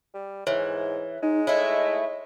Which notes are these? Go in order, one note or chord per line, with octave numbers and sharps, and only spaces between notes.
G3
G#2 E3 C#5
G#3 D#4
A3 E4 C#5 D#5